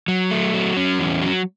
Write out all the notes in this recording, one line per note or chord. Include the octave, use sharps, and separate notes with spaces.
F#3
A3
F#3
C#4
E2
F#3